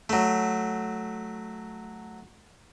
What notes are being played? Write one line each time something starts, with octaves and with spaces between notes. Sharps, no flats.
F#3 A3